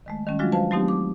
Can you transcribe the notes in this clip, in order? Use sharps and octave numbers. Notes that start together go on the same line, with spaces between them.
D#3 G#3 A3
D#3 G3 C#4
F3 F#3 G#3 D4 F4 F#4
B4 C5 F5 A5
F#3 A3 C4 D#4 G4
D6